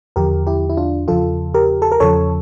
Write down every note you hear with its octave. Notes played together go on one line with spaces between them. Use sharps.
E2 D3 F3 G4 A#4
E4 G4
E4
D4 F4
E2 C#3 F3 F4 A4
G4 A#4
A4
A#4
E2 C#3 F3 A4 C#5